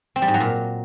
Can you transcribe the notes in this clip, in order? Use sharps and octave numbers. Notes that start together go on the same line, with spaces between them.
C4
G3
G#2
F#3
A#2